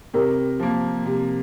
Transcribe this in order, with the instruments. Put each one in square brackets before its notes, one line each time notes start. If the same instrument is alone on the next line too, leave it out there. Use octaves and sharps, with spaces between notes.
[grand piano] C3 [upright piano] A#4
[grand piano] F3 A#3
C3